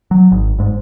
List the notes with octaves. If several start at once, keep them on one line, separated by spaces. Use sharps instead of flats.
F#3
G#1
G1 G#2